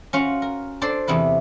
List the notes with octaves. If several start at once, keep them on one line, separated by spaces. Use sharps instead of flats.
C#4 F4 F#4
A#4
D4 A4 C5 D5
E2 C3 E4 B4